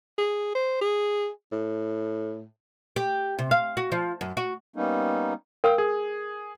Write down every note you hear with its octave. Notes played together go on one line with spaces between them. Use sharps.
G#4
C5
G#4
A2
G4
C3
F5
F#4
F3
F#2
F#4
G3 A#3 B3 C#4 D#4
A#4 F5 G5 E6
G#4